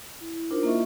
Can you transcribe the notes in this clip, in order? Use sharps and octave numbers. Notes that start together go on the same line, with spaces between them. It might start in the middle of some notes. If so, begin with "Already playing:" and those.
E4
E4
D4 D#4 F4 A#4 C5
A#3 E4 F4 D#5 E5 C#6